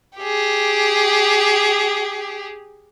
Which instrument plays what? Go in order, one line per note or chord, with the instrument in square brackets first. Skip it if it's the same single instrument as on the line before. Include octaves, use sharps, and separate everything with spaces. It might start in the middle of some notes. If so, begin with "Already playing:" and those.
[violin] G4 G#4